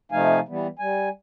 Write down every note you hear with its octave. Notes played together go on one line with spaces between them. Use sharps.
C3 F3 A3 D#4 F5 G#5
E3 G3 B3
G3 G#5